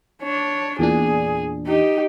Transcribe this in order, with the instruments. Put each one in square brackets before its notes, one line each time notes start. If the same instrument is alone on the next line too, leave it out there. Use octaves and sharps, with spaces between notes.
[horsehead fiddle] D4 C#5
[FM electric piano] E2 A#2 D4 [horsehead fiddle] G#4
[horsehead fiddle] D#4 G4